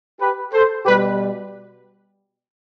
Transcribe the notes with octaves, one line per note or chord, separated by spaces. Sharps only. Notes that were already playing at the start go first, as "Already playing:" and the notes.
G4 B4
A4 C5
B2 G3 G4 B4